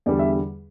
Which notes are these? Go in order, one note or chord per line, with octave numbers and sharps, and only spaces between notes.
E2 D3 G3 D5
E5